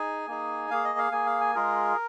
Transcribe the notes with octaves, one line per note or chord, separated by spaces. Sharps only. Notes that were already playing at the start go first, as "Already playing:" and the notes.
Already playing: D#4 G#4 G#5
A#3 D#4 G#4
A#3 G#4 F5
D#5
F5
A#3 G#4 G#5
F5
G#5
G#3 F4 G#4 A#4